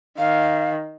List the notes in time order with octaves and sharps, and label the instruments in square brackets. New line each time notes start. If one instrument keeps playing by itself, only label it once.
[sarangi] D#3 [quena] F5